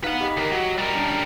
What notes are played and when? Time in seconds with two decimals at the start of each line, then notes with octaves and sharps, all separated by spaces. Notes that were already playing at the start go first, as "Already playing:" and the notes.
0.04 D#4 B4 F5 F#5
0.21 G4 D#5 B6
0.37 D#3 A#3
0.52 F#3
0.78 G3 A#4
0.95 C#4 D4 A5